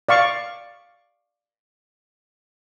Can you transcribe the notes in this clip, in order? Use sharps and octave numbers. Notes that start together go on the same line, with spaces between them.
D5 F5 C#6